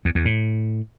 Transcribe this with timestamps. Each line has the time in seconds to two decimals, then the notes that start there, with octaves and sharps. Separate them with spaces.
0.05 E2
0.15 E2
0.25 A2